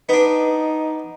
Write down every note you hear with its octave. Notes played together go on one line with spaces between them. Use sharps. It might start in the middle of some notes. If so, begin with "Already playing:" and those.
B3 D4 D#4